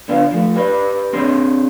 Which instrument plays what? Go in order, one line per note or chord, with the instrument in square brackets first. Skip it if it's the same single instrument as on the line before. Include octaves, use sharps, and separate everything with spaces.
[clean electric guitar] D3 B3 D4 F4
F3 A3
G4 B4 D5
C4 D4 G#4 C#5 C6